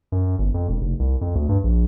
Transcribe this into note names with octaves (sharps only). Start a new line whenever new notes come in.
F#2
G1
F2
E1
F1
C2
F2
D2
G2
A#1